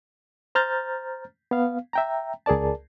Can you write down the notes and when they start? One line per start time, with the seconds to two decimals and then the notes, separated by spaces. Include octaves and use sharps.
0.55 C5 A#5 F6 G6 A6
1.51 B3 F5
1.93 E5 G5 A#5
2.46 C#2 G#4 A#4 D5 A5